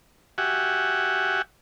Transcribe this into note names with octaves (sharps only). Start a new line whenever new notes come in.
F#4 G4 E5 F#5 G#5